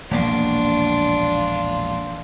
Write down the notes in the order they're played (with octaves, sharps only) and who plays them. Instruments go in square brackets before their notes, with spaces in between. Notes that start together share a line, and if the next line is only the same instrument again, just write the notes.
[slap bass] E1 A#1 A#3 [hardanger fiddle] D4 F4